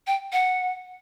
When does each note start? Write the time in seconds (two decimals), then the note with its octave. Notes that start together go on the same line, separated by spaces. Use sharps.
0.07 G5
0.33 F#5